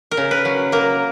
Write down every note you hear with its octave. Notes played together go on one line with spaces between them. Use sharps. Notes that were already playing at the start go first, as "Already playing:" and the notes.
A#4
C#3
B4
F#3
A#3 A#4